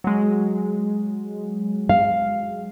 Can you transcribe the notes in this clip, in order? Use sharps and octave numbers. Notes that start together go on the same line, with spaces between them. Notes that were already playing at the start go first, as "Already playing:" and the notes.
F#3 G#3
F5